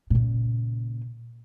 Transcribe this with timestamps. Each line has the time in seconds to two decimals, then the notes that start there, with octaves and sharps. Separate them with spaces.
0.10 A#2 C#3